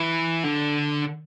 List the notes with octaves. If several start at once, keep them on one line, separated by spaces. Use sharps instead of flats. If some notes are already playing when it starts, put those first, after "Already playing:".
Already playing: E3
D3